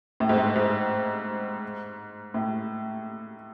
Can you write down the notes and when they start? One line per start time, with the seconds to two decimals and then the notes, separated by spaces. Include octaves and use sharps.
0.20 A2
0.29 G#2
0.38 A2
0.56 G#2
2.34 A2